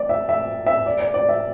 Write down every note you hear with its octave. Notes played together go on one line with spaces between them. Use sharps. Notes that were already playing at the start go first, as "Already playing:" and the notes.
Already playing: D5
E5
E5
E5
D5
D5
D5
E5